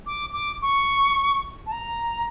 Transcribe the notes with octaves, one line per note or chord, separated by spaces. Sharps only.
D6
D6
C#6
A5
A#5